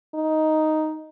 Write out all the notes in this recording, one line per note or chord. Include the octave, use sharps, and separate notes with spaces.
D#4